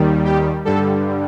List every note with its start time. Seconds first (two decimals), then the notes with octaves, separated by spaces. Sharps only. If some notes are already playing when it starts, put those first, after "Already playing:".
Already playing: D#2 D#3 G3
0.25 G4
0.65 G2 D3 G3 A4